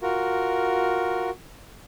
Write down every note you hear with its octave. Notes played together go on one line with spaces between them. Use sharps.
F4 F#4 A#4